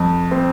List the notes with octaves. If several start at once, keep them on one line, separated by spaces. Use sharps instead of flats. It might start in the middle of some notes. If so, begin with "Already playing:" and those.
Already playing: F2
C4